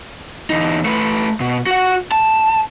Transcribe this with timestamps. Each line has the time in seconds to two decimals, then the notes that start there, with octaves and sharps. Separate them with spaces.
0.50 E2 D#4
0.85 A3 B4
1.40 B2
1.66 F#4 F#5
2.12 A5